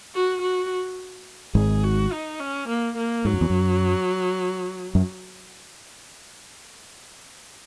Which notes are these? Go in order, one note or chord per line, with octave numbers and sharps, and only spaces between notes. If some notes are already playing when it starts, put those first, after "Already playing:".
F#4
F#4
G#1 G#2 G#4
F#4
D#4
C#4
A#3
A#3
G#2 F#3
F#2
E2
F#2
F#2